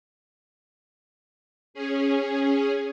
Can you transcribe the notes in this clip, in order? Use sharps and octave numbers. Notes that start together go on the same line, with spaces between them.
C#4 G#4